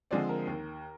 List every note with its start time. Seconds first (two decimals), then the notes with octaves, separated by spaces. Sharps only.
0.11 D3 F3 G#3 C4 D5
0.29 A#4
0.47 D#2